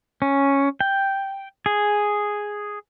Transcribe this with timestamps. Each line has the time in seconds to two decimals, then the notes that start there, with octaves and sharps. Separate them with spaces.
0.22 C#4
0.81 G5
1.66 G#4